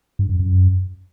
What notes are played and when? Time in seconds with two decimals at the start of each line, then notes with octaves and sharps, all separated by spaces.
0.19 G2
0.29 F#2
0.39 F#2